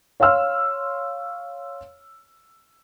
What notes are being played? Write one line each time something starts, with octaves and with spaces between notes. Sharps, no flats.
C#5 F5 C6 E6 F6